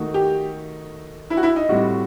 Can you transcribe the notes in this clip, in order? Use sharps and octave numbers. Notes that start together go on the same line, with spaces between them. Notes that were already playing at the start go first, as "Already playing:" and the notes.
Already playing: D#3 A3 D#4 F#4
G4
E4
F#4
E4
D#4
A2 G3 C4 F#4